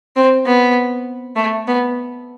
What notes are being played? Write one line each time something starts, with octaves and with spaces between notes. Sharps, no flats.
C4
B3
A3
B3